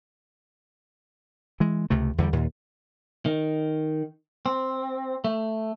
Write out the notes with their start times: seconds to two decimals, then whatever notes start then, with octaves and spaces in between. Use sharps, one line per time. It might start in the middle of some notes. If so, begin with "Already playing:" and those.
1.60 E3 G#3
1.90 C#2 C3 A3
2.18 E2 D3 F3 G3
2.33 D#2 A#2
3.26 D#3
4.46 C4
5.24 A3